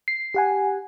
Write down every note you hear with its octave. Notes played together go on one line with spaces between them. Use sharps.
C7
G4 F#5 G#5